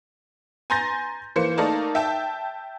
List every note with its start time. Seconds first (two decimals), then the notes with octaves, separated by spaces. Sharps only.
0.70 G#5 A#5 C6 G6 A6 A#6
1.36 E3 A#3 C5 C#7
1.58 A3 A#3 D#4 A#4 D5 A5
1.95 E5 G5 A5